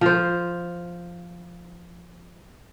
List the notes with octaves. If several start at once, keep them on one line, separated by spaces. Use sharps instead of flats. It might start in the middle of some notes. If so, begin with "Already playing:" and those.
F3 C5